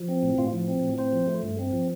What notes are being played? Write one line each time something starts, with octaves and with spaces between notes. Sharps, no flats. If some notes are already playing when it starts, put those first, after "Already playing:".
Already playing: F3
C4
A2
A2 F4
F3
C4
A2
C4 C5
F3
A3
G2
C4
F3